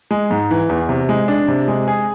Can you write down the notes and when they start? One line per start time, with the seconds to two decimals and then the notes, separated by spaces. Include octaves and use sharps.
0.11 G#3
0.31 G#2
0.51 E3
0.69 E2
0.89 C3
1.09 G#3
1.28 D4
1.48 C3
1.68 G#3
1.88 G#4